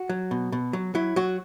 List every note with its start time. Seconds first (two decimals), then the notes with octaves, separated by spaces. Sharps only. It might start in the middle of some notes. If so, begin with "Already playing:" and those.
Already playing: F#4
0.09 F#3
0.31 B2
0.52 B2
0.73 F#3
0.95 F#3 E4
1.16 F#3 F#4